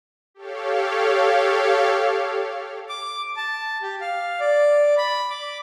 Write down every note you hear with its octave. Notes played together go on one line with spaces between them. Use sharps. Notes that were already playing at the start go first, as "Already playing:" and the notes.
G4 A4 C#5 F5
D6
A5
G4
F5
D5
B5
D6